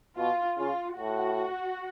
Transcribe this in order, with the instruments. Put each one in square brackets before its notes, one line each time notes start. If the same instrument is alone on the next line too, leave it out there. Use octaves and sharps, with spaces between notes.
[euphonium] B2 [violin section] F4
[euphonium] C#3 [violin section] F4
[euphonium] A2 [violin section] F#4